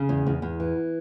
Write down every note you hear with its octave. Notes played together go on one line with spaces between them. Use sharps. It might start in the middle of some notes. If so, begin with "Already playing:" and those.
Already playing: C#3
E2
E2
E2
E3